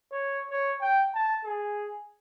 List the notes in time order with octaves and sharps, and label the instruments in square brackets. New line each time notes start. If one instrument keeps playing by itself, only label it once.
[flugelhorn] C#5
C#5
G5
A5
G#4